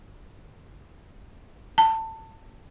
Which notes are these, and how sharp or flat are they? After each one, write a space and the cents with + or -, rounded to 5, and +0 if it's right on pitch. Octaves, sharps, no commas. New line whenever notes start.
A5 +20